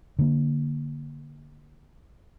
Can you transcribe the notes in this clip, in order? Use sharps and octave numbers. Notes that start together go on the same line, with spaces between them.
D3 A#3